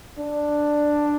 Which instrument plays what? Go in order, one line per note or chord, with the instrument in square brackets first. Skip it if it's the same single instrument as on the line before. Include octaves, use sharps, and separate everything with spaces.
[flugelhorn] D4